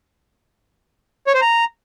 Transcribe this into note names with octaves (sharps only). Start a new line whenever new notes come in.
C#5
C5
A#5